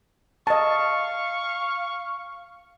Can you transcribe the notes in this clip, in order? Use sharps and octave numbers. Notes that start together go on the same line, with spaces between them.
D#5 F5 A5 C#6